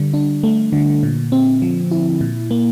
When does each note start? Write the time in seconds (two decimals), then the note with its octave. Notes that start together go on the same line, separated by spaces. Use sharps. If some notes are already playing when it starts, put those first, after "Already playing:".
Already playing: D3 G3
0.14 D4
0.43 A3
0.72 D3
1.03 A#2
1.32 C4
1.62 F3
1.91 E4
2.21 A#2
2.51 A#3